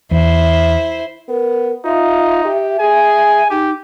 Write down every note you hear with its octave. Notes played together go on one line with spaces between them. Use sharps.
E2 E4 C5
B3 A#4
D#4 F4 E5
G4
G#4 G#5
D#4 G4